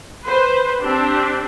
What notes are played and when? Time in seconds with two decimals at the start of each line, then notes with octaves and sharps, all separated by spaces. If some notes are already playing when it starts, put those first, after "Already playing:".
0.24 B4 C5
0.80 C4 D4 G4